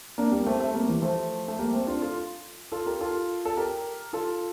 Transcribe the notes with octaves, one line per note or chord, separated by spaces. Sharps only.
A#3 D4
G3 A#3
A3 C4
A3 C4
G3 A#3
E3 G3
F3 A3
A3
G3 A#3
A3 C4
D4 F4
F4 A4
F4 A4
G4 A#4
F4 A4
A4
G4 A#4
F4 A4